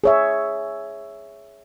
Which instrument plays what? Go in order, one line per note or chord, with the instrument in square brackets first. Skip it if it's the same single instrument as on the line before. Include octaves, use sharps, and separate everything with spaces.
[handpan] G#4 C#5 E5